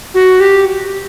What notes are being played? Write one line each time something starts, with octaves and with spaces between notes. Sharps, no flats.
F#4
G4